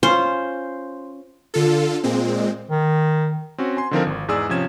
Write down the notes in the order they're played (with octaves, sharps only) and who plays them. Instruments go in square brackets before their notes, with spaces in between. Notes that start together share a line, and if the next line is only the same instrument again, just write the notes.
[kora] C#4 F4 [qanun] C5
[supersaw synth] D3 F4 A4
A#2 G#3 C4
[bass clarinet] D#3
[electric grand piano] C4 C#4 F#4
G#5 C6
D3 D#3 F3 C4 F4 A#4
G#1
E2 G#2 G#4 D5 E6
C3 F3 C#4 G#6 E7